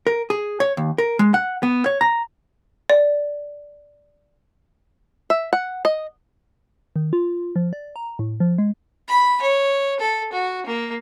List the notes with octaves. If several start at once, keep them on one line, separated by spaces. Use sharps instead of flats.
A#4
G#4
C#5
D#2
A#4
G#3
F#5
B3
C#5
A#5
D5
E5
F#5
D#5
D#3
F4
F3
D5
A#5
A2
F3
G#3
B5
C#5
A4
F#4
A#3